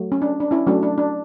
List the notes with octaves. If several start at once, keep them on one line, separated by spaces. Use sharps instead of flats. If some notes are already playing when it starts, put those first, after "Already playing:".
Already playing: F#3 A3
C#4
D4
D4
C#4 E4
F#3 A3 C#4 D4 F#4
D4
D4